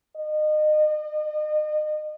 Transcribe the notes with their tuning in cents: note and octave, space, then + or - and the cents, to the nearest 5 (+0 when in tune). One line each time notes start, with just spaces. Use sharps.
D#5 -35